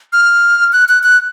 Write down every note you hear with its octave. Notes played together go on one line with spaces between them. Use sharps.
F6
F#6
F#6
F#6